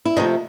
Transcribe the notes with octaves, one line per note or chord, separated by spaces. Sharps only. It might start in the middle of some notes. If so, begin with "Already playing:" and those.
E4
C3 D#3 F3 A3 D#4